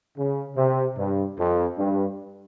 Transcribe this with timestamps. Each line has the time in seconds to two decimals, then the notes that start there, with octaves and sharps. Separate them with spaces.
0.16 C#3
0.55 C3
0.96 G2
1.37 F2
1.77 G2